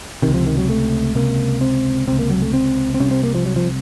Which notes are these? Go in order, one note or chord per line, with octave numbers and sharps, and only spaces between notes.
C#2 C3 D#3
F3
D#3
F#3
A3
C#2 C3 A#3
C4
C#2 C3 C4
A#3
F#3
A3
C4
C4
C2 C3 C#4
C4
A#3
F3
F#3
F3